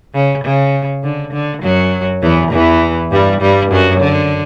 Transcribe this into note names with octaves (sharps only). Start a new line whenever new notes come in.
C#3
C#3
D3
D3
F#2 F#3
E2 E3
E2 E3
G2 G3
G2 G3
F#2 F#3
D3